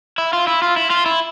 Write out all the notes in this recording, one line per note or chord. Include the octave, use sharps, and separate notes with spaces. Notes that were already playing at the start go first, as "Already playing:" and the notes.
E4
F4
E4
F4
E4
F4
E4